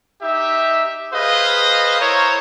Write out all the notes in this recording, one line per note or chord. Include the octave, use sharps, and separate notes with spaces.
D#4 G4 E5
G#4 B4 C5 D#5 F5
E4 A#4 C5 C#5